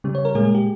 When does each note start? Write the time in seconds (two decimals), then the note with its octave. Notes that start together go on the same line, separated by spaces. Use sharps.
0.04 C#3 G3
0.15 C#5
0.25 A#4
0.35 A#2 G#3 G#4
0.45 G#4
0.55 G4